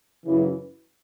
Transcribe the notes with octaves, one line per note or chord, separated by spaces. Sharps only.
F#2 C#3 E3